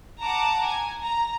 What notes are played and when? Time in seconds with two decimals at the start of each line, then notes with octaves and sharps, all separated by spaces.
0.21 F#5 A5 A#5 D6
0.65 G#5
1.02 A#5